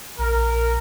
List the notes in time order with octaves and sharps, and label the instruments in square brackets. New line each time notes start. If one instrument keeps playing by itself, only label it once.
[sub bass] A#1 [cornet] A#4